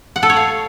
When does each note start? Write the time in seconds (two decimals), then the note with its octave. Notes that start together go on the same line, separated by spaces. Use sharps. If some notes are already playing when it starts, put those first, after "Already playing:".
0.16 F#5
0.23 A4
0.30 C#5
0.37 F5